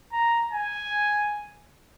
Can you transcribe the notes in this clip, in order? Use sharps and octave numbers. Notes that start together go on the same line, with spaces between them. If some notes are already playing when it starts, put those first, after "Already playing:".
A#5
G#5